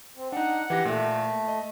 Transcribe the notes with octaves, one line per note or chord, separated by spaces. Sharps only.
C4
D4 D#4 F#5
E3 G4 A#6
A#2 A3
D#5